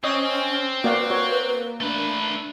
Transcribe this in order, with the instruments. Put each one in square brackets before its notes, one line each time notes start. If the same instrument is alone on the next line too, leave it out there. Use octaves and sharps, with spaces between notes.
[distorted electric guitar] C4 [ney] C#4 [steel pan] C#5 D#5 D#6
[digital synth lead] A#3 [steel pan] F#4 D5 F5 [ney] B4
[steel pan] F#4 C#5
[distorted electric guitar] A3 B4 [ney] D4